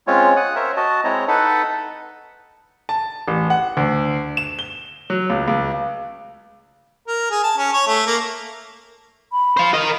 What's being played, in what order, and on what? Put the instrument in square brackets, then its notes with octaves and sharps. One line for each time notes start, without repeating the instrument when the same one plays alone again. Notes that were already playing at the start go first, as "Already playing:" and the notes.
[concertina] G#3 C4 C#4 F4 C#5
F#5 D#6 F#6
A#4 C5 C#5 E5
F#4 D#5 A5
G#3 C4 E4 C#5 D#5 A#5
D#4 A4 B4 F#5 A5 B5
[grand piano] A5
A1
F#5
D2
E7
G7
F#3
C#2
C#2
[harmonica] A#4
G#4
A5
C#4
C#5
A3
A#3
[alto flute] B5
[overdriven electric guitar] C5 F5
A#4 D#5